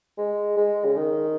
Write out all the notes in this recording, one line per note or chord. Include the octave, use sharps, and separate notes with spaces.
G#3
G#3
C#3
D#3